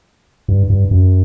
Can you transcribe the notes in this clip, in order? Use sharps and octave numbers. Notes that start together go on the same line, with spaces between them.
G2
G2
F#2